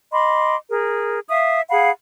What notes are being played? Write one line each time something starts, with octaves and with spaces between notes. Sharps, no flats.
D#5 B5 C6 D6
G#4 A#4
E5 F5 D#6
G#4 F5 F#5 B5